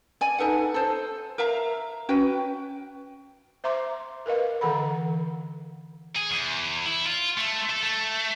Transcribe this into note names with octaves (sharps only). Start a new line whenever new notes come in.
D5 G#5
D#4 A4 B4 F#5
A4 C5
A#4 E5 F5 A#5
C#4 F#4 B4 G5
C5 E5 A#5 C6 D6
A#4 B4 D#5 F5
D3 E3 A4 F#5 B5
G#4
E2
E4
F4
A3
A4
A3